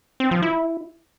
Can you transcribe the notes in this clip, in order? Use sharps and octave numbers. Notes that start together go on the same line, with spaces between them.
C4
F3
E4